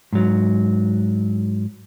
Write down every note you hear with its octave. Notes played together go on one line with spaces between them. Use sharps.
G#2 F#3